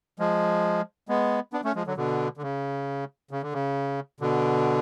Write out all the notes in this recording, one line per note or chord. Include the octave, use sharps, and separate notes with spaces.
F3 G#3
G#3 B3
B3 D4
A3 C#4
F3 G#3
D3 F#3
B2 D3
D3
C#3
C#3
D3
C#3
B2 D3